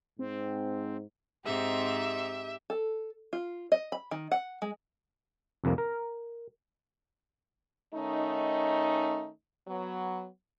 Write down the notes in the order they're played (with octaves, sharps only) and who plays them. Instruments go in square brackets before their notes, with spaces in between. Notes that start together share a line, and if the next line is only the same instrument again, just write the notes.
[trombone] G#2 [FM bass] C4
[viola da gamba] G#2 C4 D#4 [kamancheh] G4 E5
[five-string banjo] A4
F4
D#5
B5
D#3
F#5
G#3
[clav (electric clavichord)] C2 F2 C3 A#3
A#4
[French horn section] D#3 A3 C#4 D#4
F#3 B3